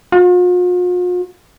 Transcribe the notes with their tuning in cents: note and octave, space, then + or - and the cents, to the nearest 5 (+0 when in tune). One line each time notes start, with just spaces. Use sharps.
F4 +45